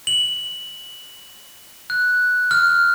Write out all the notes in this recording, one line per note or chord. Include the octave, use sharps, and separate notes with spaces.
F#7
F#6
F6